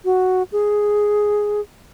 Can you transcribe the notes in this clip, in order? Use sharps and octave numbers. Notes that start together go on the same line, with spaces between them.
F#4
G#4